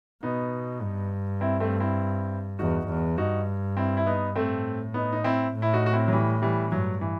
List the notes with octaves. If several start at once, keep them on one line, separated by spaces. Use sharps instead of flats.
B2 B3 D#4
G2
C4 E4
A3 C4
C4 E4
E2 D#4 F#4
E2
G2 D#4 F#4
C4 E4
E4
B3 D#4
A2 A3 C4
B3 D#4
D#4
C4 E4
A2
E4
D#4 F#4
F#4
C4 E4
F#3
E3 G3
E3 G3
E3
G2 F#3
E3